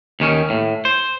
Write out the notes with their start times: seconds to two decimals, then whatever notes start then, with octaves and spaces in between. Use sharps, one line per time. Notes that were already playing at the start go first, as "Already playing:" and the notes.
0.20 D#2 D#3 C#4
0.50 A2
0.85 C5